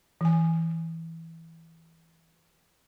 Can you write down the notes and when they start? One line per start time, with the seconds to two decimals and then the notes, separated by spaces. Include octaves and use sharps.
0.21 E3 G#5